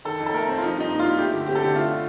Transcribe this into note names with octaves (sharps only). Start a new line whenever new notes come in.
D#3 A4
F2
A4
A3 A#4
C4
F4
F3 D#4
G2 D#4
A#3
F4
G2
A3 G4
D3
C4 G4
A4
D3 G4
A3 F4
D3